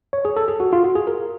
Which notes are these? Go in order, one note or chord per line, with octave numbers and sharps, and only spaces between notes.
C#5
G#4
A4
G#4
F#4
F4
F#4
G#4
A#4